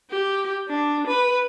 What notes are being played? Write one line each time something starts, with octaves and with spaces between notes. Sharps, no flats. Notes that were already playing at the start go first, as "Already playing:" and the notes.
G4
D4
B4